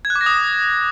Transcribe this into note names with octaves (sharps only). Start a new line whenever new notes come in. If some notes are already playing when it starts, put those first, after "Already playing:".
G#6
F#6
D6
A#6
D#6